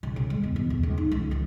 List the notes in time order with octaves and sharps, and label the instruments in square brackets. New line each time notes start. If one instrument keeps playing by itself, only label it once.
[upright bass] C#3
C#3
G#3
E2
E2
E2
C#2
D#4
C#2
E3